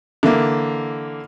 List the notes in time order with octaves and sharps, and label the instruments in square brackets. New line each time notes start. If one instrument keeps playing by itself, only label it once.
[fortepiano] D3 E3 A#3